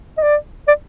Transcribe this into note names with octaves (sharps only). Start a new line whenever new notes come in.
D#5
D5
D5